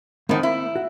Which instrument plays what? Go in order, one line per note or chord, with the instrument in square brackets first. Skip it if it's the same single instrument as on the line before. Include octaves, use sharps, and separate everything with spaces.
[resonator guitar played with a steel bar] A2 D#3 [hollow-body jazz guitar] A#3 C4 F#5
[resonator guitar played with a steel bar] E4
[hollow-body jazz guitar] F#4